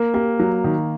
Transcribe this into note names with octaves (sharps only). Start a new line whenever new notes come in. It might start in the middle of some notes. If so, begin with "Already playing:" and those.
Already playing: A#3
A#3 G4
F#3
D#3